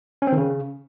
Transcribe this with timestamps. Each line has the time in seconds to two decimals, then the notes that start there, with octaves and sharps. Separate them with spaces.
0.22 C#4
0.27 C4
0.32 D#3
0.37 C#3